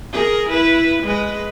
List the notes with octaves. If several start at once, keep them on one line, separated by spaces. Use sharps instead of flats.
G#4 A#4
E4 B4
G#3 B4